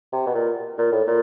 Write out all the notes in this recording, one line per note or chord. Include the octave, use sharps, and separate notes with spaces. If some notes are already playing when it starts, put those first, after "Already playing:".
C3
B2
A#2
A#2
A2
A#2